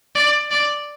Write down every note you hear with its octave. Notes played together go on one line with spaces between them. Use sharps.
D5
D5